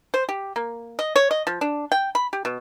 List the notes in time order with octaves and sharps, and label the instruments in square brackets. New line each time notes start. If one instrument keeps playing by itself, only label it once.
[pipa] C5
G4
A#3
D#5
C#5
D#5
F3
D4
G5
B5
G4
B2